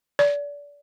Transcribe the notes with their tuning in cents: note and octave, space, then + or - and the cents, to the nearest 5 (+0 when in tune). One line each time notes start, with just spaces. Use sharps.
D5 -30